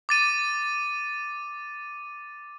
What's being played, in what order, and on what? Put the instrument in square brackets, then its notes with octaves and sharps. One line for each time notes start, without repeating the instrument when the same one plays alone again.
[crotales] D6 A6 D#7